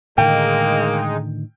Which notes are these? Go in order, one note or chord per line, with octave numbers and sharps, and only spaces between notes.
A2 D3 D#3 G#3 A#3 D#4 G5